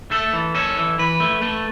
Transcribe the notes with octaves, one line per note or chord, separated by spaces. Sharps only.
A3 A4
E3
C#4 A4
E3
E3 B4
A3
A3